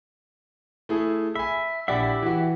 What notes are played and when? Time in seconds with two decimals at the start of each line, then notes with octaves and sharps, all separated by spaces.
0.89 A3 E4 G#4
1.36 E5 G#5 B5
1.88 A#1 E4 G4 D5 E5 F#5
2.22 E3 F#4